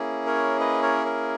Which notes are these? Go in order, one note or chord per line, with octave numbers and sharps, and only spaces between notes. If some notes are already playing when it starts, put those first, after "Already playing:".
Already playing: A#3 C#4 E4 G#4
A#4 C#5
B4 D#5
A#4 C#5
A#4